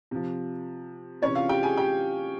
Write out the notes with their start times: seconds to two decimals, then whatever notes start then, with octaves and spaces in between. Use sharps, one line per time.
0.11 C3 F3
1.22 C3 E3 C#4 C#5
1.35 F4 F5
1.49 G4 G5
1.63 G#4 G#5
1.77 G4 G5